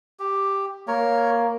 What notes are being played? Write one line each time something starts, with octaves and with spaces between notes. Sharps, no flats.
G4
A#3 A#4 C#5